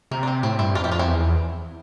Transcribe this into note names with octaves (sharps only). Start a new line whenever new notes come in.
C3 A#3
D4
C4
A2 C4 E4
G2 C4 E4
F2 D4 F4
E4 G4
D4 F4
C4 E4
E2